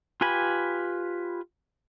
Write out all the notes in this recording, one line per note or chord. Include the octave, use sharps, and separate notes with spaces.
F4 G4 B4 G#5 B5